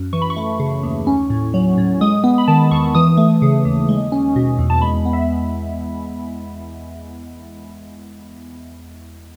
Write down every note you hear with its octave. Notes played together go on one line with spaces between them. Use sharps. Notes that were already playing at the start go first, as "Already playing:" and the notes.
Already playing: F#2
E3 C#6
B5
C#6
A3
C#3
D#2
C#4
A2
F#3
A2
G#3 D#6
B3
B5
D#3 A5
E2 C#6
E3 D#6
A3
C#3
D#2
G#3
C#4
B2
E2
A5
G#3 B5
B3
E5